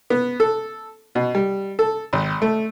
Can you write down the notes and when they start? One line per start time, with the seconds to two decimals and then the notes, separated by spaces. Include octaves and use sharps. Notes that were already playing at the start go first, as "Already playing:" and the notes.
0.10 B3
0.40 A4
1.15 B2
1.35 G3
1.79 A4
2.13 G#1
2.42 A3